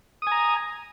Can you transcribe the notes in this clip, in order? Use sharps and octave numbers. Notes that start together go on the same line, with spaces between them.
G#5 A#5 D#6